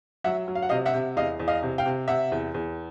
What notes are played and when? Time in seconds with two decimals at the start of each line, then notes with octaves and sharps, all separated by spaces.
0.24 F#3 E5 F#5
0.48 F#3
0.55 F5
0.62 F#5
0.69 C3 D#5 F5
0.86 E5 F#5
0.94 C3
1.16 E2 D#5 F5
1.40 E2
1.48 D#5 F5
1.63 C3
1.78 F5 G5
1.86 C3
2.08 C3 E5 F#5
2.32 E2
2.54 E2